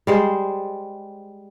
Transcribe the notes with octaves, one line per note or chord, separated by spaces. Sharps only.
G3 G#3 C5